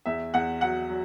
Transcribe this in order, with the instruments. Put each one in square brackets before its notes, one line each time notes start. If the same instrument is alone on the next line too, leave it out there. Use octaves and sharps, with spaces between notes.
[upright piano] E2 E5
E2 F#5
F#3 F#5
F#3